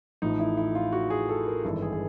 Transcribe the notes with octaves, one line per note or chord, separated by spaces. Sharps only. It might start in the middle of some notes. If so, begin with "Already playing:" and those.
A1 A2 F3 D#4
E4
E4
F4
F#4
G#4
A4
A#4
G#1 G2 E3 A4
G#4
G#4